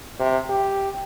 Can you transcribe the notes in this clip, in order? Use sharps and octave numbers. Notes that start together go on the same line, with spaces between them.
C3
G4